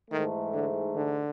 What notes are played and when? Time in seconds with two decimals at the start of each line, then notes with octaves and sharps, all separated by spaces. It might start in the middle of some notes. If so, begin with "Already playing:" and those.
0.11 G#2 D#3 E3 A3
0.54 D3
0.95 D3